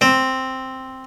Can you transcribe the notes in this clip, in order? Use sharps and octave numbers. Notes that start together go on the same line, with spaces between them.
C4